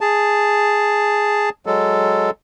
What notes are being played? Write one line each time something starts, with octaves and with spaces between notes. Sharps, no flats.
G#4 A5
F#3 G#3 A4